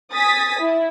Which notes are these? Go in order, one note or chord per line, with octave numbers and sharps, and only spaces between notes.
G#5 D#6 A6 B6
E4